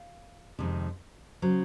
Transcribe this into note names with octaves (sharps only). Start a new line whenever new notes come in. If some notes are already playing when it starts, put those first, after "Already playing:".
Already playing: F5
F2 C3 D#3 G#3
C#3 F#3 C5